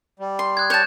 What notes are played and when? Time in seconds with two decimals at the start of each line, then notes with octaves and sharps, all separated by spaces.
0.19 G3
0.39 C6
0.57 D#6 F#6 G#6
0.70 C#5 A5 F#6 G6 E7